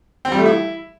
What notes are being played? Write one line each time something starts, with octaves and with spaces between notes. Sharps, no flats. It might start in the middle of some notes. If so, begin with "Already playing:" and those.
C4
G3
A3
E4